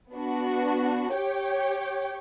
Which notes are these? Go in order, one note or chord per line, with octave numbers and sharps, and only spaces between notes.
B3 D4 F#4
G4 C#5 G5